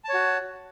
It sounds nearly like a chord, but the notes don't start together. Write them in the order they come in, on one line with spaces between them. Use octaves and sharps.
A5 C#5 F#4